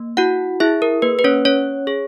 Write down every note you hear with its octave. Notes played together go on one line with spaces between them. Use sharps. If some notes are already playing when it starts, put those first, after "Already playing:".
Already playing: A#3
E4 F#4 F#5
E4 G#4 E5
A#4
A#3 B4
B4
C#4 C#5
C#4 C#5
G#4